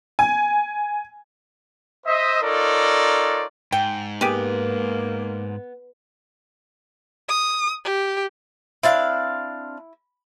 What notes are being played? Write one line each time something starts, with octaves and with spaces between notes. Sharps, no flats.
G#5
C5 D#5 E5
D#4 F4 A4 A#4 C#5 D5
G#2 G5
A#3 B3 G4 G#4
D#6
G4
C4 D4 E4 F5